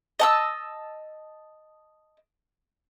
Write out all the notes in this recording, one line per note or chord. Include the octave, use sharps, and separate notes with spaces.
D#5 A5 E6